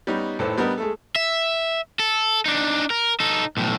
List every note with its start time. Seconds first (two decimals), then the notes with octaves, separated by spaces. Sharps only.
0.07 G3 B3 C#4 D#4
0.39 G#1 A2 A4 B4 C5
0.57 G3 B3 D4 A#4 B4 D#5
0.78 G#3 A3 A4
1.16 E5
1.99 A4
2.46 D4 D#4
2.90 A#4
3.20 D#4 A4
3.57 B1 A2